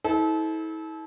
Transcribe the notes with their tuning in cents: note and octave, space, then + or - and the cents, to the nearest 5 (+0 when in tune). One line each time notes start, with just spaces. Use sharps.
E4 -40 A4 -30 C5 -25